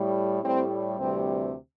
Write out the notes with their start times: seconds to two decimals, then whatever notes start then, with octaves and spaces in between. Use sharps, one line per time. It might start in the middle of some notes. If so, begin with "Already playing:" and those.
Already playing: A2 G3
0.43 A2 G3 C4
0.99 D2 C3 E3 G3 C4